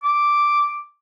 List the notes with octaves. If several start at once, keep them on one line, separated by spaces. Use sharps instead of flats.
D6